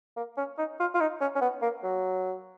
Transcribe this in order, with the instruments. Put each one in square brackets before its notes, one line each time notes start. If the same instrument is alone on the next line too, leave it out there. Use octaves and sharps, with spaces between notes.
[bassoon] A#3
C#4
D#4
F4
F4
D#4
C#4
C#4
B3
A#3
F#3